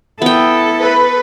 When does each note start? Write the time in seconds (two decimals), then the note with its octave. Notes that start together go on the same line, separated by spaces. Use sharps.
0.22 B3 E4 A4 G5
0.82 B4